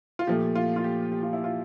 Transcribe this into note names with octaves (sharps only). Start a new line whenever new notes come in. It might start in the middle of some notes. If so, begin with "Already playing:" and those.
F4
A#2 F3 A3 G4
F4
F4
G4
G4
F4
E4
F4